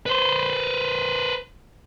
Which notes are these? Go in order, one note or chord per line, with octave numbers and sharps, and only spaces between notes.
B4 C5